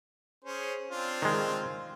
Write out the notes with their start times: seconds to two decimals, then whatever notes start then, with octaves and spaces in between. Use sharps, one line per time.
0.45 C#4 G#4 C5
0.91 C4 D4 F4
1.22 D#3 G#3